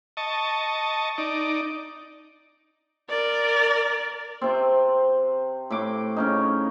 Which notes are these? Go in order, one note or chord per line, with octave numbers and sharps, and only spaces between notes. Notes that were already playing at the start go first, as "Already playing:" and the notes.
D#5 A5 C#6
D#4 D5
A#4 D5
C3 C4
A2 D6
C#3 C#4 D#4